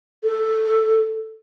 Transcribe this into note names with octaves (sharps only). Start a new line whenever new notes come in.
A4